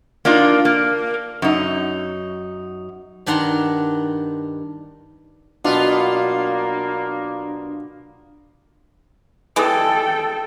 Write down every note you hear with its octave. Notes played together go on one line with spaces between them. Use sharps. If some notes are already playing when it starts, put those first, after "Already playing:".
A#3 D4 D#4 F4
A#3
F#2 D#4
G2 D#3 D4 F#5 A#5 C6
B2 F#3 A#3 B3 D4 F4
E3 G3 G#3 A4 G5